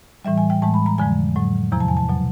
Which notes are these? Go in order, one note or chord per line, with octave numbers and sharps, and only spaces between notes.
A2 E3 G3 E5
G#5
G5
A2 E3 G#3 A5
B5
A#5
F2 D3 F3 G#3 G#5
A2 F#3
E2 C3 F3 A#5
A5
G#5
A5
B2 F#3